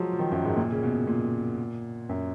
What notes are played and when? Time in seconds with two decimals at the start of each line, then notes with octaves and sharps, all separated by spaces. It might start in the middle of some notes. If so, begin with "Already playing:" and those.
Already playing: F3 F#3 G#3
0.13 F3
0.19 D#3
0.32 F#2
0.44 G#2
0.57 A#2
0.72 C#3
0.83 B2
1.07 A#2
2.09 F#2